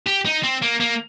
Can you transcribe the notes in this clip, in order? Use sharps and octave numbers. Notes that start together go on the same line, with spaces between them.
G4
D#4
C4
A#3
A#3